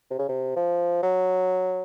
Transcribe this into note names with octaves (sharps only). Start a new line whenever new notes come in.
C3
C#3
C3
F3
F#3